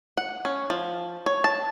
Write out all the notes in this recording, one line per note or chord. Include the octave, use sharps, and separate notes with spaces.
F#5
C#4
F3
C#5
A5